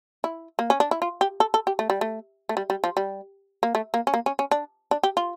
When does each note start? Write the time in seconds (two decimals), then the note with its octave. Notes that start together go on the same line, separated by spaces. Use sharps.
0.24 E4
0.59 A#3
0.70 C#4
0.80 D4
0.91 E4
1.02 F4
1.21 G4
1.40 A4
1.54 A4
1.67 G4
1.79 A3
1.90 G3
2.01 A3
2.49 A3
2.57 G3
2.70 G3
2.84 F3
2.97 G3
3.63 A#3
3.75 A3
3.94 A#3
4.07 C#4
4.14 A#3
4.26 C#4
4.39 C#4
4.51 D4
4.91 D4
5.03 G4
5.17 F4